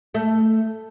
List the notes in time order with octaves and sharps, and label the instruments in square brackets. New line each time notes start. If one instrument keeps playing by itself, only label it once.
[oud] A3